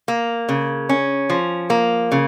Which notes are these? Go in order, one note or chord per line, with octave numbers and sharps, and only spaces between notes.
A#3
C#3
C#4
F3
A#3
C#3